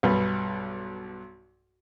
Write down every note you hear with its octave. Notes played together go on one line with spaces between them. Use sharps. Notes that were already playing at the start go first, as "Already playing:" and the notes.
B1 G2 B4